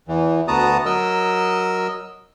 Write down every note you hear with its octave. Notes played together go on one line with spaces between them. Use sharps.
E2 E3
D2 B3 F#4 A5 A#5 D#6
F#3 A#4 D#5 E6